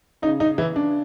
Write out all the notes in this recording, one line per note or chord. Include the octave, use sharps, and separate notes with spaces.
C#3 D#4
D#4
E3 E4
D4